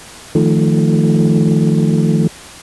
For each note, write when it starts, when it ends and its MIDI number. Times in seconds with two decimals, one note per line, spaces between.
0.35 2.27 51
0.35 2.27 53
0.35 2.27 57